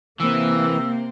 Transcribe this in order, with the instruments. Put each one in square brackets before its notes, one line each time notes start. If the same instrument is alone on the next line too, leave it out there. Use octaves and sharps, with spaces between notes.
[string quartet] C3 C4 [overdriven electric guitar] E3 [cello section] A#3 [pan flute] E6